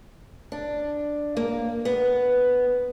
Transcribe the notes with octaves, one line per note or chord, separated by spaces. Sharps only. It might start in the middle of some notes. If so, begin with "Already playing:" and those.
D4
A#3
B3